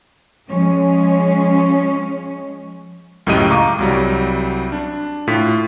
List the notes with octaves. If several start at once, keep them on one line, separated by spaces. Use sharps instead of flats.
F3 G#3 C#4
C#2 F#2 A2 G4 D#5 D#7
F5 A#5 C#6 D6
C2 F#3 G3
D4
A2 F4 B6